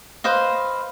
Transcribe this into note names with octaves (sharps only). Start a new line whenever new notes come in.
B4 C5 D#5 F5